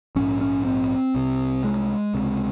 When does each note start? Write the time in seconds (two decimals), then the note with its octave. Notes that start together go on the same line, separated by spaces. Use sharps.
0.16 A#1 G#2 C#4
0.41 C#4
0.65 C4
1.15 C2 C3
1.64 G#3
2.14 C#2 C3